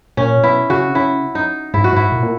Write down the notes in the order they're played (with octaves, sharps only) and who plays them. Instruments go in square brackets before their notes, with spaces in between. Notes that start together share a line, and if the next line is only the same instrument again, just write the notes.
[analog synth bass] A#2 [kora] C#4
[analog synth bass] B2 [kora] E4
[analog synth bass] C#3 [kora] F#4
[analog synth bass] C#3 [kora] E4
[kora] D#4
[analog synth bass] G#2 [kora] E4
[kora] F#4
[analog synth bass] G#2 [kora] E4
[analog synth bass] A#2
A#2